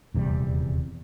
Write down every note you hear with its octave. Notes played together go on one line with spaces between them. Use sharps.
D#1 E2 C3 G3